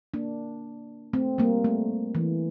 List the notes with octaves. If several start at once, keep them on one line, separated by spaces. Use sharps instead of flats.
A#3 D4
A3 C4
G3 A#3
A3
E3